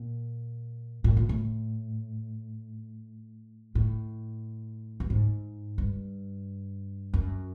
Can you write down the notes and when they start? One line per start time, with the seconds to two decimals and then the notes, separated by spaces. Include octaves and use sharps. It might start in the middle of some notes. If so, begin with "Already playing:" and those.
Already playing: A#2
1.04 A2
1.17 A#2
1.29 A2
3.75 A2
5.00 G2
5.10 G#2
5.78 G2
7.14 F#2